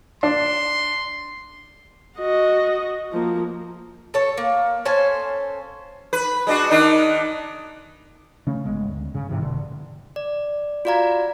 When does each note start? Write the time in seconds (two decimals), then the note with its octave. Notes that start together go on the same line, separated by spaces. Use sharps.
0.23 D4 C6
2.18 F#4 D#5
3.13 F3 A#3
4.14 A4 C#5 A5
4.37 A#3
4.85 C#4 A4 C5 G#5
6.13 B4
6.47 G#3 D4 F#4
6.71 D#3 D4 D#4
8.47 C#3 A3 C#4
8.64 G1 G#3 B3
8.88 D2
9.14 G2 C#3
9.29 G#2 C3 E3
9.42 F1 B2 D3
10.16 D5
10.85 F4 F#4 D5 F5 A#5 G#6